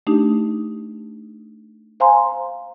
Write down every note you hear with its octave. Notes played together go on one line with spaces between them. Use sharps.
A3 D4 D#4 G4
C5 F5 G#5 A#5 C6